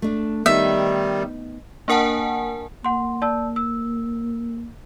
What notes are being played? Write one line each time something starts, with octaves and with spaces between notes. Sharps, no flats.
A3 D4
D#3 G3 B3 D#4 E5
A#3 D4 A#4 F#5 G#5 A5
A#3 F#5 C6
D5 A5 E6
E6